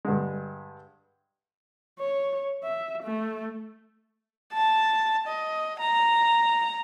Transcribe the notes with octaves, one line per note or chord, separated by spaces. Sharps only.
G2 D3 G#3
C#5
E5
A3
A5
D#5
A#5